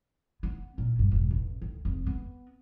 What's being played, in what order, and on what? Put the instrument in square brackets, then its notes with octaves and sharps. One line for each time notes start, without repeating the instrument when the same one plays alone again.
[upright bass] B3
A#2
G2
E1
A1
D2
F1
B3